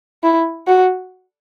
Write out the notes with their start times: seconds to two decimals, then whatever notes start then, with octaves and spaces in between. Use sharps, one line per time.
0.23 E4
0.67 F#4